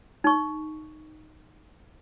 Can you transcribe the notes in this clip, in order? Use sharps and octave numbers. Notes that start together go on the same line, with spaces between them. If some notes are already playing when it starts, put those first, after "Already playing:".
D#4 C#6